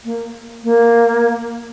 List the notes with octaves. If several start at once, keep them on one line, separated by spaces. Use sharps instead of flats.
A#3
A#3